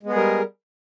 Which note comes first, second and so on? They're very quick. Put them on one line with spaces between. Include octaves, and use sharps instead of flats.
G#3 B3 G#4 G3 A#4